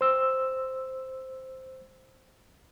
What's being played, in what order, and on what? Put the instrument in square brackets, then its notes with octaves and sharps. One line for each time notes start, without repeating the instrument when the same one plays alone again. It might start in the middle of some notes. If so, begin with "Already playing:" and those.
[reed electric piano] C5 E6